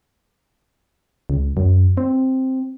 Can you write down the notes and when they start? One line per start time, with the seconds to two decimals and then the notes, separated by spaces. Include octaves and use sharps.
1.30 C#2
1.57 F#2
1.97 C4